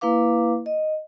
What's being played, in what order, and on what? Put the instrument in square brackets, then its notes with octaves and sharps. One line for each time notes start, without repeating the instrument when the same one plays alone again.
[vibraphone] A#3 E4 B4 F5 D6
D#5